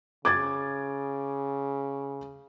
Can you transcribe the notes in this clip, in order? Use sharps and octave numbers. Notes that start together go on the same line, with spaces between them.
C#3 D6 G#6 A6